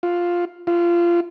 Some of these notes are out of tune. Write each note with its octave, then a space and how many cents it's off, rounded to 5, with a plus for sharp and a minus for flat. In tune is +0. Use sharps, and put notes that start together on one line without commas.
F4 +5
F4 -20